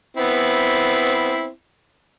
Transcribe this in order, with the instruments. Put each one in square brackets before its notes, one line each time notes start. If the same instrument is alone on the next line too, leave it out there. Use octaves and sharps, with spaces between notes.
[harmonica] B3 C4 E4